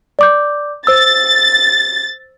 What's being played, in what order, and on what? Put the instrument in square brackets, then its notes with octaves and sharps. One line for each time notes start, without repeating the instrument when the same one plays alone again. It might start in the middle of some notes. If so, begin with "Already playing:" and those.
[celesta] D5 D6 G6
[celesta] C5 E6 [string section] A6